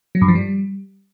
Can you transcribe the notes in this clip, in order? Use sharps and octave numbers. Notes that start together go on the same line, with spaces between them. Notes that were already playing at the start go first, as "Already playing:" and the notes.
F#3
G2
F3
G3